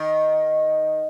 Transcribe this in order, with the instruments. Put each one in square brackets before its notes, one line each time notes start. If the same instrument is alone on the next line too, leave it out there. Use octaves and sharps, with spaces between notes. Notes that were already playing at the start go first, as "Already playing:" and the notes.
Already playing: [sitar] D#3